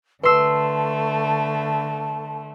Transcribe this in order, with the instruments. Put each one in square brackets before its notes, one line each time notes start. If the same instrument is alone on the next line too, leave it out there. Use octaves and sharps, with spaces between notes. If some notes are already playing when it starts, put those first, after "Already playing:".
[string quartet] D3 A3 [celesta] B4 C7 [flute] A5 [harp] C6 E6